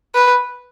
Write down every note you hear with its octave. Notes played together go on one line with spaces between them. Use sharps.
B4